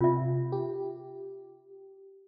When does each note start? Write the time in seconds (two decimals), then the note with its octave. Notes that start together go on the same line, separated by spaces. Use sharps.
0.01 C3 F4 E5
0.52 G4